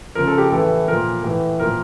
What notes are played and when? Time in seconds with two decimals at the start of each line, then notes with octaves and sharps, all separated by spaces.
0.15 C#3 F3 A#4
0.27 A4
0.38 G4
0.50 A2 E3 A4
0.88 A#2 F3 A#4
1.23 A2 E3
1.59 A#2 F3 A#4